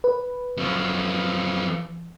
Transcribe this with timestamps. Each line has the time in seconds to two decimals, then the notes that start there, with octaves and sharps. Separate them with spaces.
0.04 B4
0.57 F#2 F3